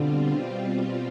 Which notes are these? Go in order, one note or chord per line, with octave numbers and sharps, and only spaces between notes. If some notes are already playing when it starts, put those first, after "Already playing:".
Already playing: B2 D3 G3 C4 F4